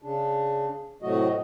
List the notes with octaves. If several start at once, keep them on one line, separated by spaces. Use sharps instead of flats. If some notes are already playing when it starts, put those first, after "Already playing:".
C#3 D4
A2 C3 F#3 A3 F#4 D#5